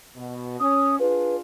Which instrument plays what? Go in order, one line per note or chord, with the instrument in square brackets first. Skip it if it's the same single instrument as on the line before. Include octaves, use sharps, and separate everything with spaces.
[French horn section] B2
[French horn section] C#4 [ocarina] D#6
[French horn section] D4 F4 G#4 [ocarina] B4